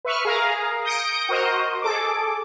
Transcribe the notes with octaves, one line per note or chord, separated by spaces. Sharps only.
B4 E5 C#6 F6
G#4 A#4 F5 A#5
D#6 G6 A#6 C#7 D7
F#4 A#4 C5 D#5
G#4 A4 D6